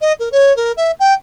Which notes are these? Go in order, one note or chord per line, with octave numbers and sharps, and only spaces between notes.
D#5
A#4
C#5
A#4
E5
G5